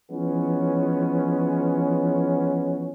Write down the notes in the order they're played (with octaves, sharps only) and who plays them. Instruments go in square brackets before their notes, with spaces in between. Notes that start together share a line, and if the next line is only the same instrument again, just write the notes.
[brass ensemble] E3 F3 G#3 B3 C#4